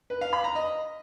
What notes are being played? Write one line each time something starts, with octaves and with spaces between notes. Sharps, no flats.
B4
F5
B5
A#5
D#5